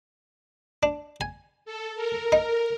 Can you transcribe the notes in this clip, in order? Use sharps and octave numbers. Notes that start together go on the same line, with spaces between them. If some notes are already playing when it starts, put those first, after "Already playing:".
D4
G#5
A4
A#4
D#4